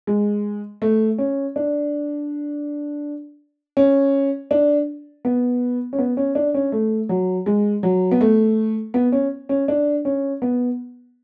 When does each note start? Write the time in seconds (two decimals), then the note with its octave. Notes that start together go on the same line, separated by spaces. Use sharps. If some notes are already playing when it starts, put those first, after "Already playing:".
0.07 G#3
0.82 A3
1.18 C#4
1.56 D4
3.77 C#4
4.51 D4
5.25 B3
5.93 C#4
5.99 B3
6.17 C#4
6.35 D4
6.54 C#4
6.72 A3
7.09 F#3
7.46 G#3
7.83 F#3
8.11 B3
8.21 A3
8.94 B3
9.12 C#4
9.49 C#4
9.68 D4
10.05 C#4
10.42 B3